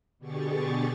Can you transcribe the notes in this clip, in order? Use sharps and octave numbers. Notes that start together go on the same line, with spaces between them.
B2 D3 G4 G#4 C#6 A6